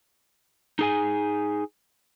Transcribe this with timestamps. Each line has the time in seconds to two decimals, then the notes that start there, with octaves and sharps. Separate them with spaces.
0.79 D#4 G#4 G#5